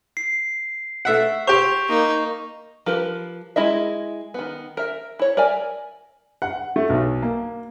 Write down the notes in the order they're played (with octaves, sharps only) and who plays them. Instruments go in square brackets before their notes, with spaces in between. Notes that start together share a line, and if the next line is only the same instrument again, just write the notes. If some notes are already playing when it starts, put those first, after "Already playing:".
[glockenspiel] C7
[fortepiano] A3 E5 F#5
[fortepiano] G4 C5 [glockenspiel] C#6 F7
[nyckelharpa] A#3 D#4
[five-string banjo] F3 G4 A#4 B4
G#3 E4 D#5 E5
D#3 B3
A#4 E5
E4 C#5
A#4 D5 E5 G#5
[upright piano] F#5
A3
B1
A#3